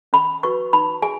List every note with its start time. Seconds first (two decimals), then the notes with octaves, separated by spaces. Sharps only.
0.13 C#4 B5
0.43 F#4 B4 C#6
0.73 D#4 B5
1.02 G#4 G#5